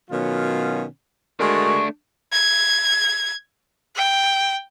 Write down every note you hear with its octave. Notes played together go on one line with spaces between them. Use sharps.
B2 D#3 F#3 C#4 F4
G#3 A3 D4 F#4 A#4 C#6
G#6
G5